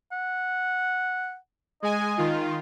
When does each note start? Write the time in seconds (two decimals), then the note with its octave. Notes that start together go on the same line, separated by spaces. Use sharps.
0.12 F#5
1.83 G#3 D#5 G#5
2.18 D#3 F4